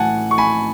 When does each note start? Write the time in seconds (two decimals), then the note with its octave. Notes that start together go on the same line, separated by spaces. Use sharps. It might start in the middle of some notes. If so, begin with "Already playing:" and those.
Already playing: A2 E3 F#5 G#5 A5
0.31 C#6
0.38 G#5 B5